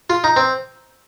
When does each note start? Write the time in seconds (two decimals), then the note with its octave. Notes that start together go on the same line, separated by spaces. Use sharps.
0.10 F4
0.24 D#4
0.36 C4